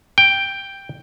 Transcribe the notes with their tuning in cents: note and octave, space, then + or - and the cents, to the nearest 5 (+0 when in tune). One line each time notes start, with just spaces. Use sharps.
G5 +5